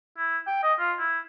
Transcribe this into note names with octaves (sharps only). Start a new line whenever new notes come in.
E4
G5
D#5
F4
E4